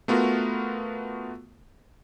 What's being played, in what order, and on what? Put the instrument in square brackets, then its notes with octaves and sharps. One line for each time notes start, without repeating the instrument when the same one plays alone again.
[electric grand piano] A3 B3 F4 F#4 A#4